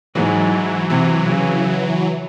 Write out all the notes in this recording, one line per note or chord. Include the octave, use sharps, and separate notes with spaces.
G#2 E3 F#3
C3 E3 F#3
C#3